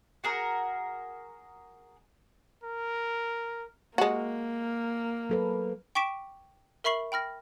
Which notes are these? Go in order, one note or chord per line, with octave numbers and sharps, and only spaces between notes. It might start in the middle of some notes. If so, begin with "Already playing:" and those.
F#4 G#4 A#4
A#4
G#3 A#3 F#4
F#3 A4 B4
G5 C#6 D6 B6 D7 E7
A#4 E5 B5 C#6 C7 F#7
G5 B5 F6 A#6